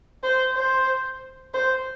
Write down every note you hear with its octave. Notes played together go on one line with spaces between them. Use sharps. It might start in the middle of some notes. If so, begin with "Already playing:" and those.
C5
C5
C5